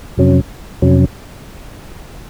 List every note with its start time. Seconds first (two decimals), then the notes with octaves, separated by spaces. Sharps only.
0.17 F2 C3 F#3 C#4
0.82 F2 C3 F#3 C#4